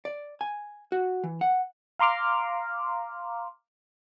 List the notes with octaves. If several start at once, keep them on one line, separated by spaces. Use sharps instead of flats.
D5
G#5
F#4
E3
F#5
F5 A#5 C6 D6 F6